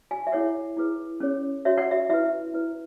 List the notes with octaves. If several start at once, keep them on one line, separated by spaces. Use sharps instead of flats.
G#5
E5
E4 G#4 C#5 F#5
E4 G#4 B4
C#4 G#4 C#5
F#4 C#5 E5
F#5
E5
E4 B4 E5
E4 B4